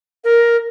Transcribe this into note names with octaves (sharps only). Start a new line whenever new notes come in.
A#4